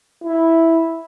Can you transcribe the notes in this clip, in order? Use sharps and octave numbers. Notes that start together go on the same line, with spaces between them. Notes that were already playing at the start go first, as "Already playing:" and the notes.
E4